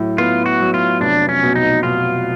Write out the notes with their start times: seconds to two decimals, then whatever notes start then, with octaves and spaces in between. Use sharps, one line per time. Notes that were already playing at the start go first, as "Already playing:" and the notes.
Already playing: A2 F#3
0.18 B3 F4
0.46 F#4
0.60 F#3
0.74 F4
1.00 F1 D4
1.29 C#4
1.43 B2
1.55 D#4
1.83 B2 F4